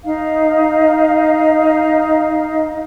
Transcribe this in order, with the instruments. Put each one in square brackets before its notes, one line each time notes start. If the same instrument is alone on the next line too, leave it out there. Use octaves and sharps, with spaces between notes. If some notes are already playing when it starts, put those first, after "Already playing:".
[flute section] D#4 D#5 F5